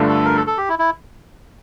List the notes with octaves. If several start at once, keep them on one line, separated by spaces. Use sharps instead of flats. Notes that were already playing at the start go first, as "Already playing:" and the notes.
Already playing: G2 D3 A3 D4 F4
A4
A#4
A4
A4
G4
E4
E4